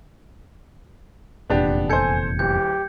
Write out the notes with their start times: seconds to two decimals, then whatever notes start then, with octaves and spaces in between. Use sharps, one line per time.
1.50 F1 E2 A#2 B3 D4 G4
1.90 A4 C5 G#5 G6 G#6 C#7
2.39 D1 G4 G6